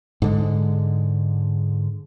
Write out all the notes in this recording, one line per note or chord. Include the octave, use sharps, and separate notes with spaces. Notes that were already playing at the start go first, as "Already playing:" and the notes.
G#2 D3 G#3